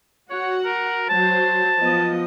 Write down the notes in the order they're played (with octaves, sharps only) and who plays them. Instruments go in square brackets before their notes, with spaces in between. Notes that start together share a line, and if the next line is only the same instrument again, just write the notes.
[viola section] F#4 F#5 [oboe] C#5
[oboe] A#4
[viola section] F#3 C5 [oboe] A5
[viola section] F3 B3 D#5